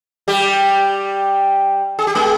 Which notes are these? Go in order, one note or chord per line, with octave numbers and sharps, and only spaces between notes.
G3 G4
G#4
G4
G#3 G#4